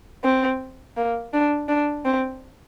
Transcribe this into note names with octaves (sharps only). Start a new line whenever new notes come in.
C4
A#3
D4
D4
C4